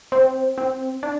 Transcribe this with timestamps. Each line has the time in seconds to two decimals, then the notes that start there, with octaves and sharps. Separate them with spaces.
0.12 C4
0.58 C4
1.03 D4